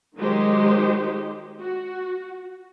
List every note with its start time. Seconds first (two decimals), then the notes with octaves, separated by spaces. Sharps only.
0.17 D#3 F#3 G#3 D#4 G4 C5
1.60 F#4